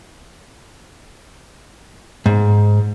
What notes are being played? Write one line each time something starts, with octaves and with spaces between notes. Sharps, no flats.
G#2